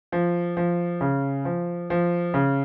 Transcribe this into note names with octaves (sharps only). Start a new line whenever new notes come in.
F3
F3
C#3
F3
F3
C#3